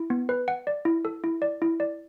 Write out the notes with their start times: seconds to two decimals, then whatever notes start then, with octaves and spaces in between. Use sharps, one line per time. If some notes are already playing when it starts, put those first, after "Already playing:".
Already playing: E4
0.10 B3
0.29 B4
0.48 F#5
0.67 D5
0.85 E4
1.05 A4
1.24 E4
1.42 D5
1.62 E4
1.80 D5